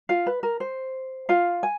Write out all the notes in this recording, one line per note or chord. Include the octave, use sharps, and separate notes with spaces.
F4 F5
B4
A#4
C5
F4 F5
G#5